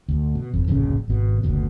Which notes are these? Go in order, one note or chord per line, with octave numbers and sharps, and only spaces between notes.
D2
B2
G1 F2
D1 A#1 F#2 C#3
G#1 B2
F#1 D2 B2